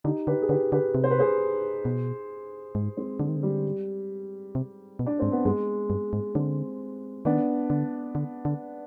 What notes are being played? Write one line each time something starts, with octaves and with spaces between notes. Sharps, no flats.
D3 D#4 G4
D3 G4 B4
G#4
D3 G4 B4
D3 G4 B4
C3
C5
B4
G#4 C5
B2
G#2
G#3 C4
D3 G#3
D#3
D3
G3
C3
B2
D4
G#2 C4
B3
G2 G#3
G2
G#2
D3 G#3 C4
D#3 B3 D4
D3
D3
D3